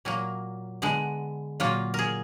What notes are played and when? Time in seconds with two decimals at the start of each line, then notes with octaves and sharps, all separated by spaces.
0.05 A#2 F#3 A#3
0.82 D3 G#3 B3
1.60 A#2 F#3 A#3 F4
1.94 G#4 A#4